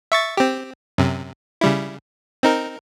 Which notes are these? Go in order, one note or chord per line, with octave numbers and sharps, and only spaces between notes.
E5 C#6 A6
C4 G4
F#2 C3
C#3 G3 E4
C4 D#4 A#4